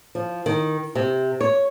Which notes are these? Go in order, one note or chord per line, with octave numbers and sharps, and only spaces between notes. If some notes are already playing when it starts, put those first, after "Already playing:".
F3
D#3
C3
C#5